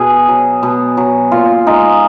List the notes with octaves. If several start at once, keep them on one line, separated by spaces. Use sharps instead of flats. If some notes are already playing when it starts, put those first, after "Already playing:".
Already playing: B2 G#4
F#3
B2
F#3
A#2 F4
G#3 D#4